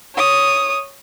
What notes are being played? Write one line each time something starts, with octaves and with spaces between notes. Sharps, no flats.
C#5 D#6